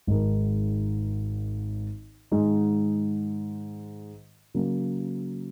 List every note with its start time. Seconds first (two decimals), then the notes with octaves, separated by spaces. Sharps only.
0.07 G#1 G#2 G#3 D#4 A#4
2.32 G#2 D#3 G#3 D#4
4.54 C#3 F#3 A#3